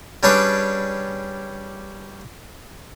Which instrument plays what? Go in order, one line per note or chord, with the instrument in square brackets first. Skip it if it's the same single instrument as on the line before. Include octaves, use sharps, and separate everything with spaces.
[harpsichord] G3 C#4 D4 G4 G#4 B4